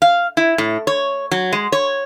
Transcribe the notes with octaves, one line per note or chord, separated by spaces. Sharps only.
F5
E4
A2
C#5
F#3
G#3
C#5